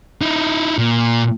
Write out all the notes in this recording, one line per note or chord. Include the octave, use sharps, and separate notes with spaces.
D#4 E4
A#2